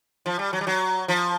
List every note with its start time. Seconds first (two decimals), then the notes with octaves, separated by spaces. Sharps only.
0.26 F3
0.39 G3
0.53 F#3
0.61 G3
0.67 F#3
1.08 F3